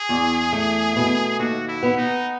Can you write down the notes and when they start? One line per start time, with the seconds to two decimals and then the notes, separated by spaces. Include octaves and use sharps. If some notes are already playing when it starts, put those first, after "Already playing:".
Already playing: G#4
0.09 E2
0.53 A3
0.96 B2
1.39 D#2 F#4
1.68 E4
1.83 B3
1.97 D#4